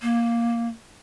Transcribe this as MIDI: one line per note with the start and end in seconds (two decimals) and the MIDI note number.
0.02 0.68 58